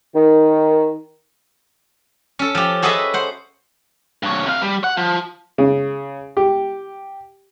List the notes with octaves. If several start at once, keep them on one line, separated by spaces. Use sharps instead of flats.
D#3
C#4 A4
F3 G4
F#4 G#4 A4 B4 D#5 E5
C5 F#5
G2 C#5
C3 F5
G3
F#5
F3
C#3
G4